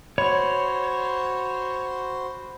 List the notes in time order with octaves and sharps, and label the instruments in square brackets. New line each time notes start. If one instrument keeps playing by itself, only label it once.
[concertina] F#4 C5 [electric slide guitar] C#5 [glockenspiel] B5